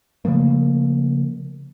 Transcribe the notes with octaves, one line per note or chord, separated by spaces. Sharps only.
C#3 F3 A3 A#3